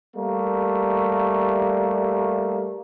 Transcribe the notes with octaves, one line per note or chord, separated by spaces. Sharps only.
G3 A3 A#3